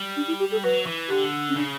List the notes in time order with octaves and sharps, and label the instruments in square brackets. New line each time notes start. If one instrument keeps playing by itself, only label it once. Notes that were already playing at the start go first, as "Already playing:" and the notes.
Already playing: [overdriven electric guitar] G3
[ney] D4
E4
G4
A4
[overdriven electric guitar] F#3 [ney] B4
[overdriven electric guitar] E3
[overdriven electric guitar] D3 [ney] G4
[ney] C#4
[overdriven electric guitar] C#3 [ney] D4